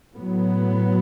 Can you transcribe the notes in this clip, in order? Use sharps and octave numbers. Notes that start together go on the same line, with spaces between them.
A2 F#3 B3